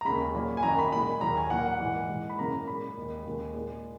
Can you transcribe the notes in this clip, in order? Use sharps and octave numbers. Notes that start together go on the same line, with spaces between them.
A#5
D#2 C#3 G#3 B5
A#2 F#3 A#3
G#5
F#2 D#3 F#3 A#5
B5
A#2 G#3 B5
D#2 D#3 F#3 A#3 A#5
G#5
A#2 F#3 A#3 F#5
F#5
G#2 E3 A#3
G#2 E3 G#3
B5
F#2 C#3 E3 A#3 A#5
A#2 G#3 B5
D#2 D#3 G#3
D#2 C#3 G#3
A#2 G#3